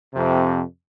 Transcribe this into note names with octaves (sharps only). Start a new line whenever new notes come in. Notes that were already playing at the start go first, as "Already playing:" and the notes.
F2 C3